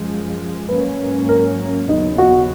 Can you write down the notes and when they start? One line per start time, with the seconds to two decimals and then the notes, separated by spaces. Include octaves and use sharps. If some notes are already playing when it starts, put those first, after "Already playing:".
Already playing: F#2 F3 G#3
0.69 G#2 F#3 A#3 C#4 B4
1.29 A#4
1.88 D#2 C#3 F#3 B3 D#4
2.18 F#4